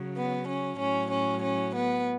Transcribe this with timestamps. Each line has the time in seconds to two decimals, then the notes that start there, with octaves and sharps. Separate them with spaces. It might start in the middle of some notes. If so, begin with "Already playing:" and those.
Already playing: C#3 F#3
0.16 B3
0.47 C#4
0.79 A2 F#3 C#4
1.11 C#4
1.42 C#4
1.75 B3